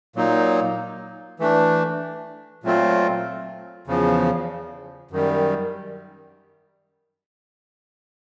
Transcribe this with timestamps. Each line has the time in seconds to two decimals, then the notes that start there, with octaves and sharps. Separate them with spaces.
0.16 A#2 F#3 A#3 D#4
1.40 E3 A3 D4
2.64 A#2 F#3 A3 C4 F4
3.87 E2 C#3 F3
5.11 F#2 D#3 G3